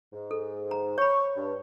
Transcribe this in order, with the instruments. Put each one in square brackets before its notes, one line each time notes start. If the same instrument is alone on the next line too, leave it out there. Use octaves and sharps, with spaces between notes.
[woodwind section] G#2
[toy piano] A4
A#5
[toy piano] C#5 B5 [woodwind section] C#6
[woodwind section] G2